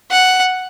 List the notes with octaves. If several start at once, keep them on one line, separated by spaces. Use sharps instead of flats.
F#5